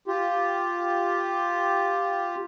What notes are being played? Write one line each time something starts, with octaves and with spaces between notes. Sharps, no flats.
F4 G4